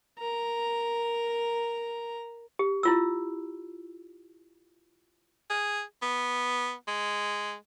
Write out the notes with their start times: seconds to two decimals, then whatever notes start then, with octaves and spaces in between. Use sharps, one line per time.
0.19 A#4 A#5
2.59 G4
2.83 E4 F4 E6
5.50 G#4
6.02 B3
6.88 G#3